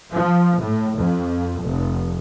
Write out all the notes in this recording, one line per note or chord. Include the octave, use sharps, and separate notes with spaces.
F3
A2
F2
F1